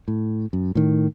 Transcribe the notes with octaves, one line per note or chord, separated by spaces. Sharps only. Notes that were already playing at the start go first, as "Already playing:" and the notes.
A2
F#2
A2 D#3